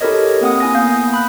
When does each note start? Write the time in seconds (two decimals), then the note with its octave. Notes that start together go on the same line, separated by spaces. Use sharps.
0.01 E4 G4 A4 A#4 C#5 D#5
0.41 A#3 C4 F#5 D#6
0.60 E4 G#5 A#6
0.74 A#3 B3 F5 G6
1.13 B5 F#6